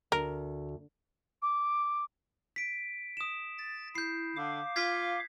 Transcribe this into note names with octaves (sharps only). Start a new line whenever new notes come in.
D2 A#4
D6
B6 D7
D#6 E7
A6
E4 G6 C7
D3 F5 D6
F4 G#6 B6 C7